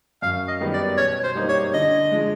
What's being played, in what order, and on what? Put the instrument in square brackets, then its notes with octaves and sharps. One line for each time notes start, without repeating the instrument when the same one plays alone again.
[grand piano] F#2 [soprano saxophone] F5
[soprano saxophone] D#5
[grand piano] D#3 G3 B3 D#4
[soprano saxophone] D5
[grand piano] B2 [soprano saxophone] C#5
[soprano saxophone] C5
[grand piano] G3 A#3 D#4
[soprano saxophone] C#5
[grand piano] D3 [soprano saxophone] D#5
[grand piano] F3 G#3